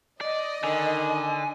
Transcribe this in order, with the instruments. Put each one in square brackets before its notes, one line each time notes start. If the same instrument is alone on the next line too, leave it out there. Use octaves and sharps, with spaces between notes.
[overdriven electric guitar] D5 [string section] D#5
[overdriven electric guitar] D3 [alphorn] D#3 [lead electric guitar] G#5